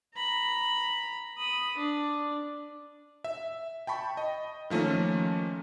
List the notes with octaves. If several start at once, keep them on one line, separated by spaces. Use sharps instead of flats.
A#5 B5
B5 D#6
D4
E5
G5 A5 B5 C#6
D#5
D#3 F3 A3 A#3 C#4